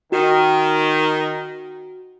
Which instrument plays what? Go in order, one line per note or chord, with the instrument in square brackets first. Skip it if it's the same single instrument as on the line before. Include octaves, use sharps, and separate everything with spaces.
[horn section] D#3 [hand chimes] F#4